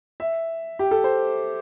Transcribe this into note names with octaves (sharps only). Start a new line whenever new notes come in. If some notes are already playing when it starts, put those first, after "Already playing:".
E5
G4
A4
C5